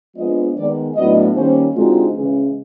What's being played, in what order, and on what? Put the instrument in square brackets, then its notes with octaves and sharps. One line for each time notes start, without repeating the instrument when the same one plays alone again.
[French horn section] F3 G#3 B3 D4 D#5
D#3 G#3 B3 D5
A2 F#3 B3 D4 D#5
D#3 G3 A#3 C#4 C5
D3 F3 G#3 C4 D#4 F#4
C#3 E3 G#3